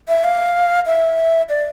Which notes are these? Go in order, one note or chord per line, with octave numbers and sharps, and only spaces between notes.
E5
F5
E5
D5